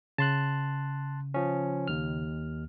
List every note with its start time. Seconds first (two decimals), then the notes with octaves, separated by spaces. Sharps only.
0.18 C#3 A5 C6 F#6
1.34 F3 C#4
1.88 D#2 F6